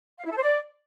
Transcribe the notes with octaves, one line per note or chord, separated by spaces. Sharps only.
F5
E4
A4
C5
D5